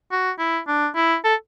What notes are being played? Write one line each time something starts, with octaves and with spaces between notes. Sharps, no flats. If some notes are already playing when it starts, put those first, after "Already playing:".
F#4
E4
D4
E4
A4